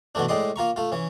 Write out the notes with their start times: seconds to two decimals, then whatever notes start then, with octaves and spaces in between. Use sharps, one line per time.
0.15 B2 D3 E3 A3 D4
0.28 A2 G#3 D5 D#5 C6 D#6
0.56 A#3 F4 A#5 C#6
0.76 A3 F4
0.92 E3 C#4